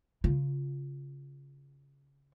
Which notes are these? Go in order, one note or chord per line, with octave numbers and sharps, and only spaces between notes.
C#3 F4